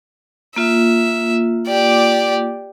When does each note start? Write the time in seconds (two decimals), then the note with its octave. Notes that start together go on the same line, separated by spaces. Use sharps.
0.56 A#3 F4 E5
1.67 G4 D5